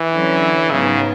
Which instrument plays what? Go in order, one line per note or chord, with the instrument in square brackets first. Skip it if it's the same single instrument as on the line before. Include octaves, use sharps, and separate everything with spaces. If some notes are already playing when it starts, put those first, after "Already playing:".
Already playing: [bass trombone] E3
[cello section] D3 F#3 C#4
[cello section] G#2 F#3 B3 [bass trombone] C#3